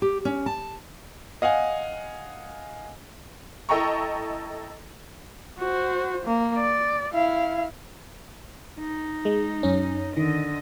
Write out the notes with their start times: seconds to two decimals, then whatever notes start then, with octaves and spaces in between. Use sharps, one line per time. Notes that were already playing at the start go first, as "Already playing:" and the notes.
0.02 G4
0.25 C#4
0.46 A5
1.42 D#5 F5 F#5 G#5
3.69 E4 A4 D#5 G5 A#5 C#6
5.59 F#4 C5
6.26 A#3
6.57 D5
7.14 E4 F5
8.80 D#4
9.25 G#3
9.63 F#2 C#4
10.17 D3 D#3 D#5